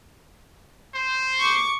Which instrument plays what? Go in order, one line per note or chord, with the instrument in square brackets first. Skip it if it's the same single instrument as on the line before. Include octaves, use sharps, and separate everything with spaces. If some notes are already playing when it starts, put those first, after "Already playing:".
[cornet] C5
[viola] C#6 D6